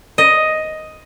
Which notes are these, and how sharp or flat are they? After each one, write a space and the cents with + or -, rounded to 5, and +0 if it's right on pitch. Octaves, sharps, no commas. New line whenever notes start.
D#5 +5